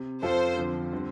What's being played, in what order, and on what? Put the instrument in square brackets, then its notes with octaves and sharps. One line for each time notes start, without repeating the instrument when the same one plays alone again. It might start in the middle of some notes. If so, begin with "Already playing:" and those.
Already playing: [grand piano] C3
[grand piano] F2 F3 C4 F4 A4 [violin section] C5
[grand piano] F2 D3 F3 C4
D3 G3 C4